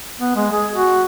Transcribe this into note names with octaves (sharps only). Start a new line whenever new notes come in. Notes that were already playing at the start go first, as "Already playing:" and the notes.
B3
G#3
G#4
F#4